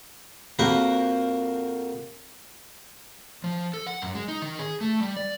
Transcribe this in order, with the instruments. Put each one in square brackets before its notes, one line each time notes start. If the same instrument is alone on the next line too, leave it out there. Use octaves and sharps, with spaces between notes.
[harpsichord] F2 A#3 F#4 G4 F#5 B5
[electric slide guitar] F3
A4
F#5
F#2
G#3
D#4
D#3
G#4
A3
G3
D5